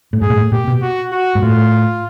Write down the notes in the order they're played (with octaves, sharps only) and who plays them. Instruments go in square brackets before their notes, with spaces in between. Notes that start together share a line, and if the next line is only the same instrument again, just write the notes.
[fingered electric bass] A2
[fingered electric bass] G#2 [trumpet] G#4
[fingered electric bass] A#2
A2
[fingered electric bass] A#2 [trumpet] G4
[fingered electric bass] B2
[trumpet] F#4
F#4
[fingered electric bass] G#2
[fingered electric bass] A2 [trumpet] F4